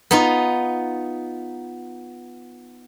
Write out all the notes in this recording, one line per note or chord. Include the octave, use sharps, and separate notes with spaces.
B3 D#4 F4